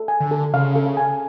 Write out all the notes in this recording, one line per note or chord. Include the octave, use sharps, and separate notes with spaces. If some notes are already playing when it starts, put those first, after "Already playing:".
Already playing: A4
G#5
D3
A4
C#3 F5
A4
G#5